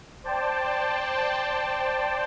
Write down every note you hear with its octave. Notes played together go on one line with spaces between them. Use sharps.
C5 D5 G5 A5